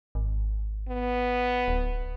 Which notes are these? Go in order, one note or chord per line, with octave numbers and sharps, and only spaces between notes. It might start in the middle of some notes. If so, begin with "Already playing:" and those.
G#1
B3
D1